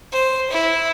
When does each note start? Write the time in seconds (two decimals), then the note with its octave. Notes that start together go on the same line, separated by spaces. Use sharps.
0.12 C5
0.50 E4